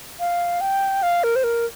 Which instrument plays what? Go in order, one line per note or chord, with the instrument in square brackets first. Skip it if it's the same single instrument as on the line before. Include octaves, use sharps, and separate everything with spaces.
[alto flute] F5
G5
F5
A#4
C5
A#4